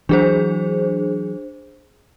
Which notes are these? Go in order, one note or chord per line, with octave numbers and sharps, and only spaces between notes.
E3 F#3 D4 G#4 C5